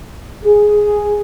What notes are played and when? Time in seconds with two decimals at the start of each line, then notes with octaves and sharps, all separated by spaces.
0.44 G#4